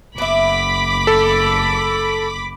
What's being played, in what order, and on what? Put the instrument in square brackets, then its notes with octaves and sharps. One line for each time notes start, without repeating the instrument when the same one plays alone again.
[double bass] F#1 [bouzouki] B3 E5 [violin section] B5 D6 B6
[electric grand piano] A4